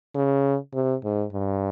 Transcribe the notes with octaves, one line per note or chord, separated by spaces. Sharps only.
C#3
C3
G#2
G2